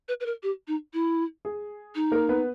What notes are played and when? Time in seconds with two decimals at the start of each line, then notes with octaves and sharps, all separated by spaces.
0.08 B4
0.21 B4
0.26 A#4
0.43 G4
0.68 D#4
0.94 E4
1.45 G#4
1.95 D#4
2.12 A#3 A#4
2.29 B3 B4